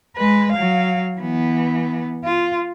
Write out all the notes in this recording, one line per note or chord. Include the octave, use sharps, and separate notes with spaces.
G#3 B4
F#3 F5
E3 B3
F4